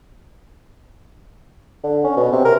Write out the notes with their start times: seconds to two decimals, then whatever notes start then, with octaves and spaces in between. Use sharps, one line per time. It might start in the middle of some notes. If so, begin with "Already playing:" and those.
1.84 D3
2.04 C#4
2.17 B2
2.32 C3
2.45 A#4